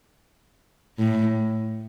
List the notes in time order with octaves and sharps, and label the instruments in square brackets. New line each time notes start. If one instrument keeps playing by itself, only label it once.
[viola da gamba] A2